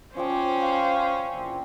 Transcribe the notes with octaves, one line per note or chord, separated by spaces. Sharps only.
F3 C#4 C5 D5 G5
F5
A#1 E3 C4